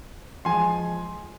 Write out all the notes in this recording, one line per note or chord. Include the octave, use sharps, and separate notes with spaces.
F3 G#3 G#5 C6